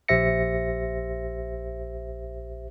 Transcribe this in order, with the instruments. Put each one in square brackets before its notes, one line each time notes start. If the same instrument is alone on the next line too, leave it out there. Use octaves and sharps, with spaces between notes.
[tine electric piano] A#1 G4 C5 E5 A#6 C#7